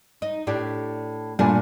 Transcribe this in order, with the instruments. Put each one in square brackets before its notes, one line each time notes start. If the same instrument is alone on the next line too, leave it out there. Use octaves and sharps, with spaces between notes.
[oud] D#4
A2 D4 G4
[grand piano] G2 A#2 G#5 [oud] A3 D4